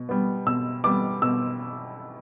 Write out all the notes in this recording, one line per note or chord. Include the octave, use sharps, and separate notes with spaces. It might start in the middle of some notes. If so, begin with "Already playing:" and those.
Already playing: B2
G3 B3
B2 E6
G3 B3 D6
B2 E6